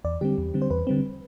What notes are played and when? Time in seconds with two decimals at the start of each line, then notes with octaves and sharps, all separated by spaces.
0.04 E2 D5
0.21 D3 G3 C4 G4
0.38 E2
0.54 D3 G3 C4
0.62 C5
0.71 E2 B4
0.87 D3 G3 C4